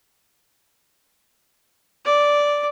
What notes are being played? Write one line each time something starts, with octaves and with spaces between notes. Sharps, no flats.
D5